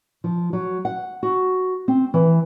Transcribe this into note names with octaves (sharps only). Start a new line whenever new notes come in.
F3
F#3
F#5
F#4
C4
E3